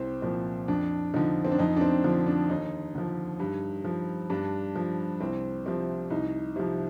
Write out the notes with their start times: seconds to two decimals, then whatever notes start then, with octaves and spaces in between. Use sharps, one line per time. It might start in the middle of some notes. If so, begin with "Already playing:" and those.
Already playing: C2 C4
0.22 A#2 F3 C4
0.68 F2 D4
1.14 D3 F3 D#4
1.45 C4
1.52 D4
1.59 F2 D#4
1.76 D4
1.81 C4
2.04 D3 F3
2.26 D4
2.49 D#2 D#4
2.95 D3 F3
3.40 G2
3.85 F3
4.30 G2 D4
4.76 F3
5.21 C2 C4
5.66 C3 F3 C4
6.10 C2 D#4
6.56 C3 F3